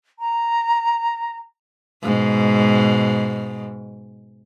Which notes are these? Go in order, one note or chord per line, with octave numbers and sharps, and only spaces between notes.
A#5
G#2 B2